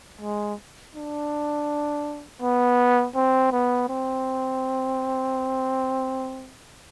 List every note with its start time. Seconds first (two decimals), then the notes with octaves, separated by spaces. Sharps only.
0.21 G#3
0.95 D4
2.42 B3
3.15 C4
3.52 B3
3.89 C4